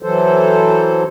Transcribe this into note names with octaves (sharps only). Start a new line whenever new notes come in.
E3 F#3 A4 C5